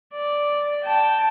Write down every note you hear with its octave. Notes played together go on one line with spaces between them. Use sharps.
D5
G5 A5